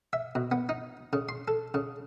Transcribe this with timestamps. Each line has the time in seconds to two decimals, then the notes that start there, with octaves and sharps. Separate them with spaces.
0.13 E5
0.35 B2
0.52 B3
0.69 D#4
1.13 C#3
1.29 C6
1.48 A4
1.74 C#3